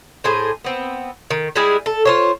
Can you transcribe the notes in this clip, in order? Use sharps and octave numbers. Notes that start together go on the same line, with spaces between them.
A2 G#4 C5
B3 C4
D#3
G3 G#3 E4 G#4
A4
F4 C5 C#5